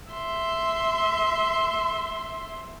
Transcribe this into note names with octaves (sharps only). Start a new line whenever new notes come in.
E5 C6